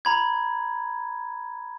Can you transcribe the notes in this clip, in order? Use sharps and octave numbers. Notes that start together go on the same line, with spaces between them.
A#5 B5 G#6